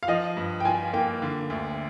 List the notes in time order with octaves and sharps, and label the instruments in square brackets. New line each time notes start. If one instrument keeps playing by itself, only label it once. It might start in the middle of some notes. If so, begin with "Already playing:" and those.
[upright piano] F5
[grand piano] F3 [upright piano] D#5
[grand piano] G2
[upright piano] G5
[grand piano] F4 [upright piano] G#5
[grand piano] A#3 [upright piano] G5
[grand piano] D3
D2